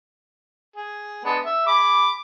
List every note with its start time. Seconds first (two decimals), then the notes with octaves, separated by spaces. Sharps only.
0.76 G#4
1.25 G#3 B3 D4
1.45 E5
1.67 G#4 B5 D6